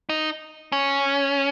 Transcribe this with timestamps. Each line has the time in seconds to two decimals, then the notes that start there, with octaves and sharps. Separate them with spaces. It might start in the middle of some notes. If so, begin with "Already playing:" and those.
0.09 D#4
0.72 C#4